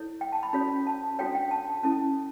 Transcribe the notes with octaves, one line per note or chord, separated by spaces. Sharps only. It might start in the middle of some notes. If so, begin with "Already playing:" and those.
Already playing: E4 A4 C#5
G5
A5
B5
C#4 F#4 A4 C#5 B5
A5
D4 F#4 A4 C#5 G5
G5
A5
C#4 E4 A4 A5